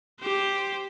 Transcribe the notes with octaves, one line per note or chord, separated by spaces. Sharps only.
G4 C5